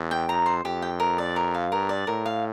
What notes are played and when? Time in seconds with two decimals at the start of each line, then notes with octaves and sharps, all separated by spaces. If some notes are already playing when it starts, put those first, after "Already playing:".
Already playing: E2
0.11 G5
0.29 F2 A#5
0.46 C5
0.65 F2 G4
0.82 G5
1.00 A#4
1.18 D5
1.36 A#4
1.54 F5
1.72 G2 A#4
1.89 D5
2.07 A2 A#4
2.26 F5